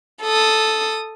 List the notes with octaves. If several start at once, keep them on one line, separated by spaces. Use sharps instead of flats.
A4 D#6